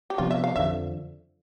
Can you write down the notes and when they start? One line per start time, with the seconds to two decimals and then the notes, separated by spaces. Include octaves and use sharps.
0.10 G4
0.18 C3 F3 B3 D4 F4
0.31 E5
0.44 F5
0.56 F2 D3 F3 E5